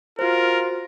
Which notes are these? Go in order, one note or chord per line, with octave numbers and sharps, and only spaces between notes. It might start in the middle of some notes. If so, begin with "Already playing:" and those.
F4 F#4 A#4 C5